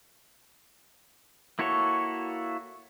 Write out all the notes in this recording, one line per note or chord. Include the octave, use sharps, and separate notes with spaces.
A#3 E4 F#4 A4 C#5